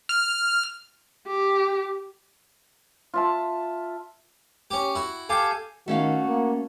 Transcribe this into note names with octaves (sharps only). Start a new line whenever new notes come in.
F6
G4
F4 E5 A5
C#4 G4
E4 F#4
G4 A4 F5 G5 G#5
D#3 A3 C#4 F#4 F5
A#3